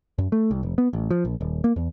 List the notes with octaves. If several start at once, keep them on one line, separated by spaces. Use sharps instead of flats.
F#2
A3
C2
F1
B3
A1
F3
A#1
D#1
A#3
E2